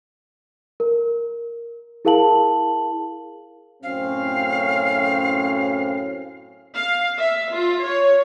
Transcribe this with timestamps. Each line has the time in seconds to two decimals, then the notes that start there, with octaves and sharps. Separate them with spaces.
0.80 A#4
2.05 E4 G#4 A#4 F5 A5 F#7
3.83 F#2 A2 C4 C#4 F5
6.75 F5
7.18 E5
7.53 F4
7.84 C#5